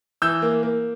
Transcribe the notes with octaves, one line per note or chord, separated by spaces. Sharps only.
E3 E6 G6
A#3
A#3